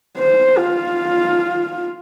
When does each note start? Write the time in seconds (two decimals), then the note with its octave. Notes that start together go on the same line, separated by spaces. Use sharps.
0.18 C5
0.58 F4